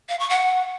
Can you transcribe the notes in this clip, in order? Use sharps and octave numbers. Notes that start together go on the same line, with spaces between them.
F5
C#6
F#5